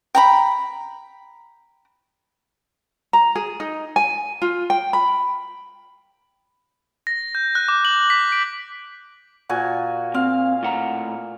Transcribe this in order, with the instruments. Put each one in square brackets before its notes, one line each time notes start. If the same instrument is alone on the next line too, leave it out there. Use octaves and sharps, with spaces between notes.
[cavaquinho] G5 A#5 B5
[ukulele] A#5
G#4
D#4
G#5
F4
G5
B5
[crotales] A#6
G6
F#6
D6
F#7
B6
D7
[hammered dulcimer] A#2 F#4 G#5
[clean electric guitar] C4 [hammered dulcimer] F5
[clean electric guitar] A2 F#5 A#5